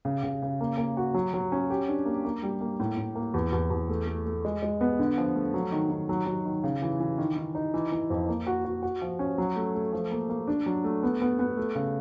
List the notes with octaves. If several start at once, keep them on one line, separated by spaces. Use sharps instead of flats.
C#3
C#3
C#3
A#3
A#3
F#4
F#3
F#3
C#4
G4
D4
A#3
A#3
G3
A#3
A2
A2
A#3
E2
E2
E2
A3
A3
A3
G#3
G#3
B3
D3
F3
A3
F#3
D#3
D#3
F#3
F#3
D#3
C#3
E3
E3
D#3
D#3
D#4
E3
E3
F2
A#3
F#4
F#4
F#4
F3
C#4
F#3
A3
A3
F3
A#3
A#3
D4
F#3
A3
B3
B3
B3
A3
C#3